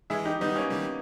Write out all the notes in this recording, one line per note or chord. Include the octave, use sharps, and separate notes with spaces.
E3 G#3 E4 G#4
D#4 G4
D#3 G3 B3 D#4
A#3 C#4
D#3 G3